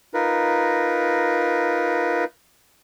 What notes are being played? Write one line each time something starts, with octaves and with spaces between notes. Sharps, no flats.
D#4 F4 A#4 B4